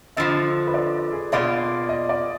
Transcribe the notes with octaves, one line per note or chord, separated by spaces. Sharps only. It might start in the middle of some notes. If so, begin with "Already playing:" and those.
F2 D3 F3 D#5
B4
D5
G#4
B2 A#3 F4 G#4 D5
D#5
D5